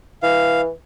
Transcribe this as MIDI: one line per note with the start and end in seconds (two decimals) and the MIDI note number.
0.23 0.69 52
0.23 0.61 77